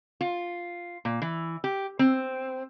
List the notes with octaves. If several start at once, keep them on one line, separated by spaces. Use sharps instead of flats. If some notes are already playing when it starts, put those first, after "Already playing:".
F4
A#2
E3
G4
C4